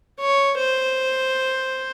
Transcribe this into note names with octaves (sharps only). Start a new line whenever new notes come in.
C#5
C5